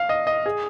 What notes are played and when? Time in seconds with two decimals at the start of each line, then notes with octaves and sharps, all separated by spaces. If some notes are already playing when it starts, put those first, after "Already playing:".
Already playing: F5
0.09 D#5
0.27 D#5
0.46 G#4